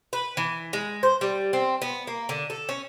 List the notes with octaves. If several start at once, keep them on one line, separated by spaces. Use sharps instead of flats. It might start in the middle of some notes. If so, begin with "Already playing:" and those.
B4
E3
G#3
C5
G3
C4
B3
A#3
D3
A4
C#4